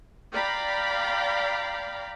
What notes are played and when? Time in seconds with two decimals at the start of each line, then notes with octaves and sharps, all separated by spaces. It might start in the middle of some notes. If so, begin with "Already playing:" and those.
0.32 D5 F5 G5 A#5 B5